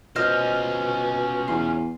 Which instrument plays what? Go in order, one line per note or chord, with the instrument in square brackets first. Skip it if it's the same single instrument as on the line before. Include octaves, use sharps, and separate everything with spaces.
[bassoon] B2 [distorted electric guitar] C#4 F4 [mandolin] C5 D#5 F6
[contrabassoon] E2 [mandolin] C6